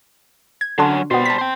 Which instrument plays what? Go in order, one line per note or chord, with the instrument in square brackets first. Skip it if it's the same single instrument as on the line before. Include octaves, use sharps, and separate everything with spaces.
[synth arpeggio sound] G#6
[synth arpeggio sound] D3 D4 C6 [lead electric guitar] F#3 C#4
[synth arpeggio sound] B2 B3 [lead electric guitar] G3 C5
[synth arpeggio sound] A5 B6
[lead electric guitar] C5 G5